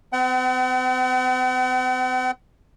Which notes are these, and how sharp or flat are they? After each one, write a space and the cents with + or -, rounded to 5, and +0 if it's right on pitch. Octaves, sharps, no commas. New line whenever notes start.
C4 -40 F#5 +45